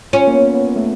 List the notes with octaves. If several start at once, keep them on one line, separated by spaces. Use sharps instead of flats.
C#4 F4
A#3
B3
B3
A3